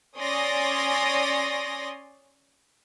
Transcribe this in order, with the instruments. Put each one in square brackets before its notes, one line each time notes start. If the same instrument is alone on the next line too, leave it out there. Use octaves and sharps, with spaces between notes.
[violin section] C#4 C#5 D5 C6 D#6 A#6